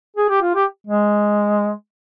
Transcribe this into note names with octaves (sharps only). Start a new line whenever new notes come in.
G#4
G4
F4
G4
G#3